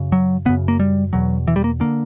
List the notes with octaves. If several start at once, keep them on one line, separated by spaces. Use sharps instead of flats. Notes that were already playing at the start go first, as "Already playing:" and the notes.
Already playing: F#2 C#3
F#3
F#2 C#3 B3
A#3
G3
E2 B2 F#3
E3
G3
A#3
D3 A#3